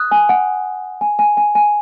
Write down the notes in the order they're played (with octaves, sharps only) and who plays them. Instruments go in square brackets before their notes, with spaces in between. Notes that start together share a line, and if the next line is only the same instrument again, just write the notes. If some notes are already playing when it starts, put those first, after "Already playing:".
Already playing: [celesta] D#6 F#6
G#5
F#5
G#5
G#5
G#5
G#5